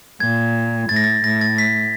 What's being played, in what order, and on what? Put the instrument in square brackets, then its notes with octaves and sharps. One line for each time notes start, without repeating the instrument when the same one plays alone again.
[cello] A#2 [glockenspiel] G#6
[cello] A2 [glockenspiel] A6
[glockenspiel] A#6
A6
[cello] A2 [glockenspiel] A#6
[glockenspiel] A6
B6